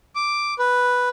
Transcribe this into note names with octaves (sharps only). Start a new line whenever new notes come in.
D6
B4